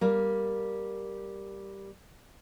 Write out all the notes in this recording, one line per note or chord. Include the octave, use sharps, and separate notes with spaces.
G3 A#3